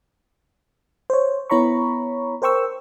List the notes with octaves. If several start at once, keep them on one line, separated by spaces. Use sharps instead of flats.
C5 C#5
B3 E4 C#5 A#5 B5 C#6
A#4 C5 G5 C#6 E6